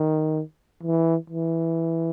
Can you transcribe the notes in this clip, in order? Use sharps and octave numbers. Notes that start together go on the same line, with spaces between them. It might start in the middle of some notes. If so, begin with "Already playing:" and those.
Already playing: D#3
E3
E3